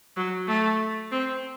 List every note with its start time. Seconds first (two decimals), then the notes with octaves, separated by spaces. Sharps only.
0.17 F#3
0.48 A3
1.12 C4